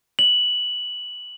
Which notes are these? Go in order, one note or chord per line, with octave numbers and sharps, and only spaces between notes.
F#7